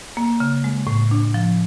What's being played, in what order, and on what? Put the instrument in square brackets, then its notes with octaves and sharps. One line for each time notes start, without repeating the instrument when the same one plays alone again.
[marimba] A#3
C#3
G#3
A2
D4
F3